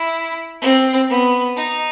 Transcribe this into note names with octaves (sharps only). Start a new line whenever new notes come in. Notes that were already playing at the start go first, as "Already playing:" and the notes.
Already playing: E4
C4
B3
D#4